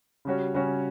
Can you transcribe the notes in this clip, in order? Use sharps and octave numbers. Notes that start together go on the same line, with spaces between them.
C#3 G3 C#4 F#4 C#5
C#3 G3 C#4 F#4 C#5